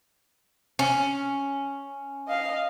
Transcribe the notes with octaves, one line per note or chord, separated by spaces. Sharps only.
C#4
D#5 F5